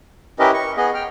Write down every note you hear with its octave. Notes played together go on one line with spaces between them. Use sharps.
C#4 E4 G4 A#4 B4 D#5
C#6
B3 G#4 D#5
G5 F6